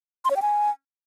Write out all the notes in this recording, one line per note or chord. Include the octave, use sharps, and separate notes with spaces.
C6
C#5
G5
G#5